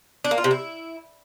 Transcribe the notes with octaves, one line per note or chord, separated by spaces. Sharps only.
D4
A#3
F4
C3
E4